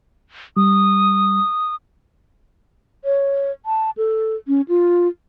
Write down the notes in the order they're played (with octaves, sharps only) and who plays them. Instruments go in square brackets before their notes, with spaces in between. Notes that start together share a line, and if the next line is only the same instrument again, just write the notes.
[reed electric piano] G3 [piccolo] D#6
[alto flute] C#5
A5
A4
C#4
F4